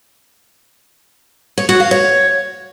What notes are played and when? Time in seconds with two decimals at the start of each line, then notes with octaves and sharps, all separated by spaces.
1.58 C#5
1.69 F#4
1.80 F5
1.91 C#5